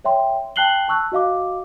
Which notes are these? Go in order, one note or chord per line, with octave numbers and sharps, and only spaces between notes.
C#5 E5 G5 C6
G5 A5 F#6 C7 F#7 G7
A5 C#6 E6 F#6
F#4 D#5 F5 D6